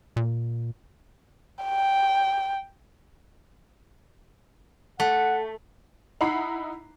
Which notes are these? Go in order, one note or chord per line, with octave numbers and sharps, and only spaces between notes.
A#2
G5
A3 F#5
D#4 E4 F#5 A#5 B5 C7